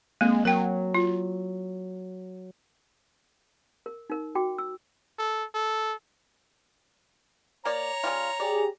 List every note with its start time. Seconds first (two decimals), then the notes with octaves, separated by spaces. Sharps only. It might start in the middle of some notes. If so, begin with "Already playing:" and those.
0.21 G#3 A#3 C4
0.45 F#3 A#4 G5
0.95 F4
3.86 A#4
4.10 D#4 A#4
4.35 F#4 G5 D6
4.58 E6
5.19 A4
5.55 A4
7.65 A#3 C#5 D5 A#5
8.04 C#3 G3 F4
8.40 G4 G#4 D5